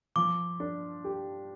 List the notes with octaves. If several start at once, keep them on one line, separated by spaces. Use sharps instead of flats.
F3 D6
D4
G4